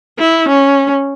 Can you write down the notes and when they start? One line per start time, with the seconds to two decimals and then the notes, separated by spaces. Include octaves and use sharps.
0.18 E4
0.49 C#4